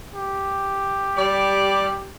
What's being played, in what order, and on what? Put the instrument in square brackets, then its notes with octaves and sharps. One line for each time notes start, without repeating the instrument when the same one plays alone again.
[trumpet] G4
[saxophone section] G3 D5